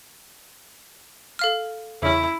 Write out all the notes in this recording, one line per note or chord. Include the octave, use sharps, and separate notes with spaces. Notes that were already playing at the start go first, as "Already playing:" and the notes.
A4 F5 F6
E2 C#3 C#4 E4